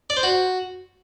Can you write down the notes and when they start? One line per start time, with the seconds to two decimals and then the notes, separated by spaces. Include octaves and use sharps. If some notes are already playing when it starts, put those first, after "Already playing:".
0.10 D5
0.17 C5
0.23 F#4